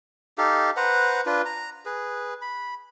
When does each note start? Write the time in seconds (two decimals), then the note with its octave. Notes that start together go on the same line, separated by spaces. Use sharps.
0.38 D#4 G4 A4 F5
0.77 B4 C5 F#5 A#5
1.26 D4 F4 B4
1.46 A#5
1.86 G#4 B4
2.42 B5